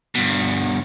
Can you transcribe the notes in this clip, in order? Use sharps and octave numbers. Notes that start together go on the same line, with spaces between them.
G2 B2